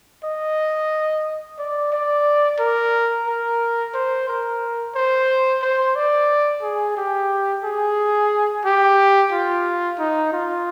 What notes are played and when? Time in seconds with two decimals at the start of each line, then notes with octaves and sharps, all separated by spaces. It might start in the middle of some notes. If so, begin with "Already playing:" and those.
0.24 D#5
1.59 D5
1.92 D5
2.59 A#4
3.27 A#4
3.94 C5
4.28 A#4
4.95 C5
5.62 C5
5.96 D5
6.62 G#4
6.97 G4
7.64 G#4
8.65 G4
9.32 F4
9.99 D#4
10.33 F4